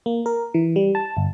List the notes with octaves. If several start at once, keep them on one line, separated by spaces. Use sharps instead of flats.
A#3
A#4
E3
G3
A5
G1